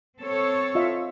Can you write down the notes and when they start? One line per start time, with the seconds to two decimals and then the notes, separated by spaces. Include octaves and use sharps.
0.19 C4 A4 C#5
0.75 F4 D#5 E5